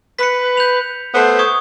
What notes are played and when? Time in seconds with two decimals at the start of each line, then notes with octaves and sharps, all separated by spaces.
0.19 B4 B6 C#7
0.57 G6 F7
1.14 A3 B3 C5
1.39 C#6 D#6 G#6